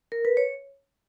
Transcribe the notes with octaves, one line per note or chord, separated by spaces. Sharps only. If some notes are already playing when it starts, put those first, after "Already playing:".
A#4
B4
C#5